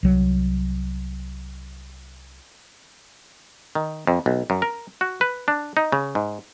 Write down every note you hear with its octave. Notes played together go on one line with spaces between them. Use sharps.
C2 F#3
D#3
F2
B1
F#2
A#4
F#4
B4
D4
D#4
C#3
G#2